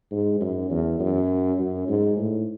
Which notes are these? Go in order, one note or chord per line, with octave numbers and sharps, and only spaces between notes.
G#2
F#2
E2
F#2
F#2
G#2
A2